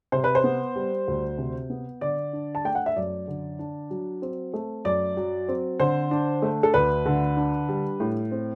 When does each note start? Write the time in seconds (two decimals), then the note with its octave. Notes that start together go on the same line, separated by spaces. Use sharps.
0.12 C3 C5
0.24 B4
0.35 C5
0.44 B3
0.76 G3
1.08 D2
1.38 C3
1.70 B3
2.01 D3 D5
2.33 D4
2.55 A5
2.65 A3 G5
2.75 F#5
2.86 E5
2.96 F#2 D5
3.28 D3
3.59 D4
3.90 F#3
4.22 C4
4.54 A3
4.85 F#2 D5
5.17 F#3
5.48 C4
5.80 D3 C5
6.11 D4
6.42 A3
6.63 A4
6.74 D2 B4
7.06 D3
7.37 D4
7.69 G3
8.00 A2
8.31 C4